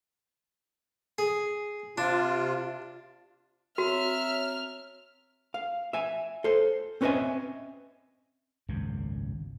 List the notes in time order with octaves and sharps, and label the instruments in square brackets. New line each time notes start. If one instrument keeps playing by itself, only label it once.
[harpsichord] G#4
[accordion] C3 F4 [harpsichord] D4
[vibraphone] C4 C#5 A#5 [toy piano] F#4 [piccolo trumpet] E5 [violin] F6
[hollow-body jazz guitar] F5
E5 G#5
A4 C5
C4 C#4 B4 D#5 E5 G#5
[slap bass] G#1 C#2 F#2 A#2